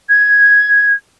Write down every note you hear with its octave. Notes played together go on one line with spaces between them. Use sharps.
G#6